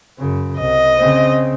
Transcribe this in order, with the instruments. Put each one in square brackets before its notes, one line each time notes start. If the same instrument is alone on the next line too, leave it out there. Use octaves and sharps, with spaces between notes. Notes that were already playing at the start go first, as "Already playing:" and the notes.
[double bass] F#2 C#3
[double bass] C2 [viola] D#5
[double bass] C#3 C4